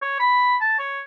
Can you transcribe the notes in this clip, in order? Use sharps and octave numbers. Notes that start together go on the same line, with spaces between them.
C#5
B5
A5
C#5